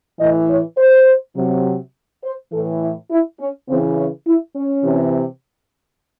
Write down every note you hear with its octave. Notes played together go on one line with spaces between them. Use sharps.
A2 E3 D#5
C#5
C5
C3 F#3
C5
A2 E3 A4
E4
E4
C#4
C#3 E3 C4
C#4
E4
C#4
C3 E3